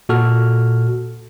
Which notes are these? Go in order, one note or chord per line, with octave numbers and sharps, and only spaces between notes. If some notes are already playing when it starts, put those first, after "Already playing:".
A#2 F#4 A4 F6